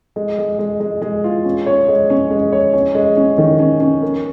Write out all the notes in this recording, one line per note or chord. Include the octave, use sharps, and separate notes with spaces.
G#3
G#3
G#3
G#3
G#3
F4
C#4
C#5
G#3
C#4
G#3
C#5
C#4
G#3
C#4
D#3
C#4
C#4
A#4